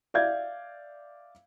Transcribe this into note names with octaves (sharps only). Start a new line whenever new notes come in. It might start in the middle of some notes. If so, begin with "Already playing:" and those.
D5 E5 F5 G6 G#6